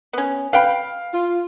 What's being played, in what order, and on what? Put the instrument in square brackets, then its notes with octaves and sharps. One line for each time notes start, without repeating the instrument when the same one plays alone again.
[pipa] B3 C#4
[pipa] B4 G5 B5 [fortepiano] F5
[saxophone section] F4